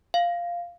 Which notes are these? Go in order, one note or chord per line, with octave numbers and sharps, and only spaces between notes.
F5